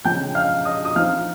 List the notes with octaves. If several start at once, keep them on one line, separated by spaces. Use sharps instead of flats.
C#3 F3 G#3 C#4 G5 G6
F5 F6
D#5 D#6
D#6
F3 C4 D#4 F5 F6